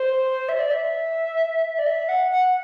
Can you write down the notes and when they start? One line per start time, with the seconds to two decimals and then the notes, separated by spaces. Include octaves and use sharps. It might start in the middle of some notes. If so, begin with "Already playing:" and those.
Already playing: C5
0.49 E5
0.59 D5
0.70 E5
1.78 D5
1.86 E5
2.09 F#5
2.31 F#5